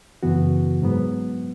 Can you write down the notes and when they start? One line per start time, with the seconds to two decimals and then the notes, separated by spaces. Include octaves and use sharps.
0.23 F#2 C#3 E3 B3 F#4
0.82 G#2 F#3 B3